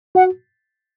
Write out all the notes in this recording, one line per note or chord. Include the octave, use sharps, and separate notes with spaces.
F#4 F#5